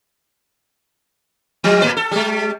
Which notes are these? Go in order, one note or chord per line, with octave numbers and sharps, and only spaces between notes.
F3 G3
A2 B4
A4
G3 G#3